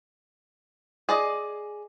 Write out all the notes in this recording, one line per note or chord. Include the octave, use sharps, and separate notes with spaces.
G#4 D5 D#5